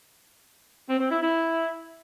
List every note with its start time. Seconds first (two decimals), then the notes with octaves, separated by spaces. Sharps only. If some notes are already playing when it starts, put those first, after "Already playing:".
0.88 C4
0.99 C4
1.10 E4
1.21 E4